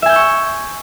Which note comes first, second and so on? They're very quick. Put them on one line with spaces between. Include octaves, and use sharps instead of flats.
E5 G#5 G6 E6 C#6